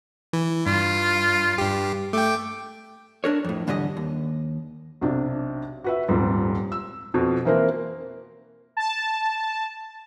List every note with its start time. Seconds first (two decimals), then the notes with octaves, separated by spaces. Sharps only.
0.33 E3
0.66 G2 F4
1.58 G2 G4
2.13 A3 G5 D6
3.24 D4 A#4 C#5
3.44 F2 A2
3.67 E2 G#2 D3 G3 G4 D#5
3.97 D#2
5.01 B1 C3 D4
5.84 F#4 B4 E5
6.08 D#1 F2 G#2 G3
6.72 E6
7.14 F2 B2
7.45 E3 A#3 C4 E4 A#4
8.77 A5